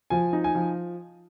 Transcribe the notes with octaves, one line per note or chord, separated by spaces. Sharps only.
F3 G#5
D#4
G#5
F3